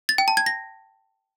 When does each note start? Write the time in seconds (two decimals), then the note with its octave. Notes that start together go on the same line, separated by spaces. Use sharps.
0.09 A6
0.18 G5
0.28 A5
0.37 G#6
0.46 A#6